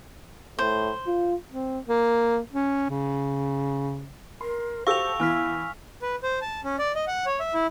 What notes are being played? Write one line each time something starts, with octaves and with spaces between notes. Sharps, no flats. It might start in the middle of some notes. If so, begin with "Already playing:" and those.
A2 C5
F4
C4
A#3
C#4
C#3
A#4 C6
F#4 G4 A4 C5 F5 C#6 E6 F7
E3 B3 E4 G#5 F6 B6
B4
C5
A5
C#4
D5
D#5
F#5
C#5
E5
E4